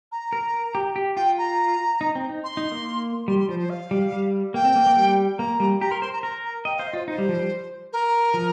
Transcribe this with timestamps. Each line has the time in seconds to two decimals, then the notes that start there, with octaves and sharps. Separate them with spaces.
0.12 A#5
0.33 A#4
0.75 G4
0.96 G4
1.16 F4 G5
1.38 A#5
2.01 D#4
2.15 C4
2.29 D#4
2.44 C6
2.57 D#4
2.72 A#3
3.28 G3 C6
3.39 C6
3.49 F3 C5
3.59 C5
3.70 F5
3.91 G3
4.12 G3
4.54 A#3 G5
4.65 C4
4.76 A#3
4.86 A#3
4.97 G3
5.38 A#3 A#5
5.60 G3
5.81 G4 A#5
5.91 A#4 C6
6.02 C5 C6
6.13 A#5
6.23 A#4 A#5
6.45 A#5
6.65 D#5 G5
6.77 F5
6.79 C5
6.87 D#5
6.93 F4 C5
7.08 D#4 C5
7.18 G3
7.29 F3
7.39 G3
7.93 A#4
8.34 F3